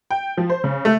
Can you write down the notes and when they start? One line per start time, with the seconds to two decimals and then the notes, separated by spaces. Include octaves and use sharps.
0.11 G5
0.37 F3
0.50 C5
0.64 C#3
0.85 A3